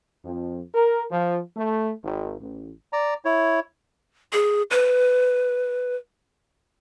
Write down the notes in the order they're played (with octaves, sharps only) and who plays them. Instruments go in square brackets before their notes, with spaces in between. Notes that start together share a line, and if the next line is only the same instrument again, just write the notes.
[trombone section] F2
A#4
F3
A3
G#1
A1
[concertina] D5 A#5
E4 C#5
[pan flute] G#4
B4